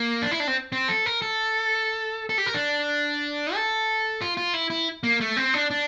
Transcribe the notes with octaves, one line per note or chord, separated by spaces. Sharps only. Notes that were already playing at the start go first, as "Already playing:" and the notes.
Already playing: A#3
D4
E4
D4
C4
C4
A4
A#4
A4
A4
G4
A#4
D4
A4
F4
F4
E4
E4
A#3
A3
C4
D4
D4